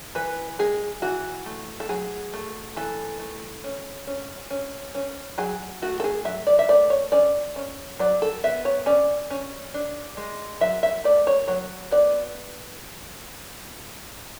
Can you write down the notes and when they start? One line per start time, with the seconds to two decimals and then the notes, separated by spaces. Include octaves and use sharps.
0.15 E3 B4
0.59 G#3 G#4
1.02 E3 F#4
1.46 A3
1.80 A4
1.89 F#3 G#4
2.34 A3
2.76 E3 A4
3.20 A3
3.64 C#4
4.07 C#4
4.50 C#4
4.95 C#4
5.38 F#3 G#4
5.82 A3 F#4
6.00 A4
6.04 G#4
6.25 F#3 E5
6.47 D5
6.59 E5
6.69 A3 D5
6.90 C#5
7.12 C#4 D5
7.56 C#4
7.99 F#3 D5
8.22 A4
8.44 B3 E5
8.65 C#5
8.86 C#4 D5
9.30 C#4
9.74 D4
10.17 G#3
10.61 F#3 E5
10.83 E5
11.04 A3 D5
11.27 C#5
11.48 F#3 C#5
11.91 B3 D5